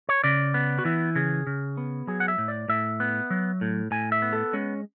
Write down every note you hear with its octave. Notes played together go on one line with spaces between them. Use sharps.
C#5
C#3 D5
B3
F#4
E3 E4
C#3 G#4
C#3
B3
F#3 G#4
F#5
E5
A2
D5
A2 E5
B3
F#3
A2
A2 G#5
E5
B3
A4
G#3 C#4